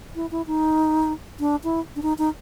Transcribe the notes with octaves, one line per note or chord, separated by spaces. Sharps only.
E4
E4
D#4
D4
E4
D4
D#4
D#4